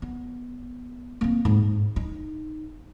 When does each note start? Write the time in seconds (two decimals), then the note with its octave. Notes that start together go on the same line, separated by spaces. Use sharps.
0.02 B3
1.21 A#3 C4
1.45 G#2
1.96 D#4